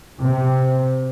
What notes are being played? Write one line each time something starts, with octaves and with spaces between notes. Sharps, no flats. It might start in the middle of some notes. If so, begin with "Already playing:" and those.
C3